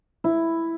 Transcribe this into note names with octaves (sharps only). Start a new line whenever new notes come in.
E4